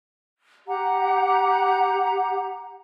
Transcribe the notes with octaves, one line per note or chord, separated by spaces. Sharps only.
G4 F#5 A#5